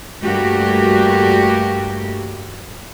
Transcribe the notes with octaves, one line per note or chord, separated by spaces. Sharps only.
G2 G3 A3 A#3 F#4 G4